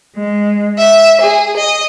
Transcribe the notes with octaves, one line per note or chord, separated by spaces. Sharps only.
G#3
E5
G#4
D#5